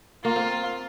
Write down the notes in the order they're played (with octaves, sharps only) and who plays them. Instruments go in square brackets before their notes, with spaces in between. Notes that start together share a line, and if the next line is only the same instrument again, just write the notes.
[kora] A#3 [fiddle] F4
[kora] C4